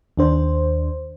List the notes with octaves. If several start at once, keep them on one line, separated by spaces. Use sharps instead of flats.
D#2 D4 C5